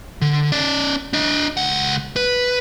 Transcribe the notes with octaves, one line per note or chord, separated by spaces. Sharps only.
D3
C#4 D5
D4 D#5
C#2 F#5
B4